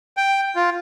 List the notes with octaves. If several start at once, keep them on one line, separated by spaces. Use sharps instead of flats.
G5
F4